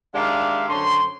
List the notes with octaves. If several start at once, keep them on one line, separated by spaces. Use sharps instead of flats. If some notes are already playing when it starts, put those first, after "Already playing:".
D#3 G#3 D4 G4 E5 F5
F#2 D3 C5 C#5 C6